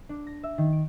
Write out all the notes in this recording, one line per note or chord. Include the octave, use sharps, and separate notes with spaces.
D4
A#6
E5
D#3
D7